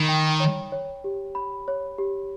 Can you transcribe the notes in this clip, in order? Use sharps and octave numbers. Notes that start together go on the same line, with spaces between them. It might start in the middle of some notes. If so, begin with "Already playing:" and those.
Already playing: D#3 B5
G5
C#5
C#5
G4
B5
C#5
G4